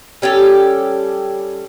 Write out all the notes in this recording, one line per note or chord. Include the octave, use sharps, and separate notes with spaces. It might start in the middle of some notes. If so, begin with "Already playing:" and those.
G3 C#4 G4 A4